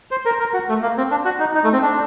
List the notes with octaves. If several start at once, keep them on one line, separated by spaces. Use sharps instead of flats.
C5
A#4
A#4
F#4
A3
A#3
C4
D4
F#4
D#4
D#4
A3
C4
D4